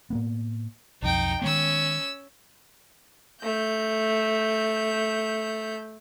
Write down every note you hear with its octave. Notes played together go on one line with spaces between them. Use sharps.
A2 A#3 B3
B1 F2 D#4 G5
D#3 G#3 B3 C#4 E6
A3 G6